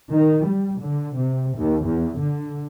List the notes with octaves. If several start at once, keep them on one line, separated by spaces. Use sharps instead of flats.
D#3
G3
D3
C3
D#2
E2
D3